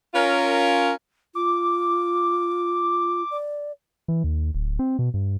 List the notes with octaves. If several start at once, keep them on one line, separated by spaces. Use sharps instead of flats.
C#4 F4 A#4
F4 D6
D5
E3
D#2
D1
C4
B2
G2